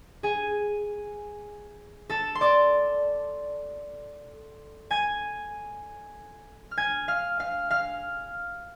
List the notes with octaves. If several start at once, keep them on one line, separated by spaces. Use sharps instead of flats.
G#4 G#5
A4 A5
C6
D5 D6
G#5 G#6
F6
G#5 G#6
F5 F6
F5 F6
F5 F6